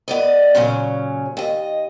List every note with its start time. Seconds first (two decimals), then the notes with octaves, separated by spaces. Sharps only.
0.08 B3 D5 D#5
0.55 A#2 C#3 F#3 C#4
1.37 D#2 D#5